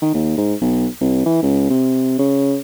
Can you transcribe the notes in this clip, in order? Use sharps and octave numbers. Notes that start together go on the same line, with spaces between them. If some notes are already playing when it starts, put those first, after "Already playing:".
D#3
D#2
G#2
B1
C2
E3
C#2
C3
C#3